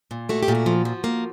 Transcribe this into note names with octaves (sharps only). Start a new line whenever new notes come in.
A#2
A3 F#4
G4
A#2
F#4
F3
F3
A#3